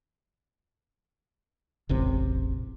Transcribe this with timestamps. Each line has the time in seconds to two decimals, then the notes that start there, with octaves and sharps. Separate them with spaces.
1.89 E1 A1 C3